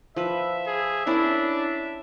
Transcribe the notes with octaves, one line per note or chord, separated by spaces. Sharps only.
F3 B4 E5
G#4
C#4 D4 E4 A#4